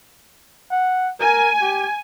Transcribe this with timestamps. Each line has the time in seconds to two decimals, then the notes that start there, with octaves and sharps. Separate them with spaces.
0.71 F#5
1.20 A#4 G#5
1.61 G4